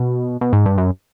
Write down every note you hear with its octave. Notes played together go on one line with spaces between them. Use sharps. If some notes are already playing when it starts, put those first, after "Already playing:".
Already playing: B2
B2
G#2
G2
F#2